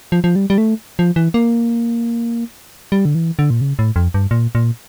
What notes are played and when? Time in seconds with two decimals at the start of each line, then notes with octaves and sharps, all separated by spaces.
0.12 F3
0.24 F3
0.36 G3
0.50 G3
0.58 A3
0.99 F3
1.16 E3
1.34 A#3
2.92 G3
3.05 D3
3.15 E3
3.39 D3
3.50 A#2
3.61 C#3
3.79 A2
3.96 F2
4.14 G2
4.31 A#2
4.55 A#2